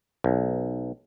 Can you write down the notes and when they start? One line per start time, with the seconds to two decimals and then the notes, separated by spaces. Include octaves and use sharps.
0.24 B1